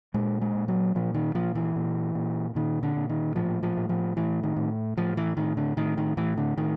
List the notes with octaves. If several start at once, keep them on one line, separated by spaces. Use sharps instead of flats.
A#2 G#3
G#3
A#2
F#3
A#2 F3
D#3
A#2 F3
E3
A#2
A#2
A#2 D#3
D3
A#2
D#3
A2 F3
F3
A2
F3
A2 E3
D#3
A2
A2 F3
E3
A2 D#3
D3
A2 D#3
D#3
A2 E3
D3
A2 D#3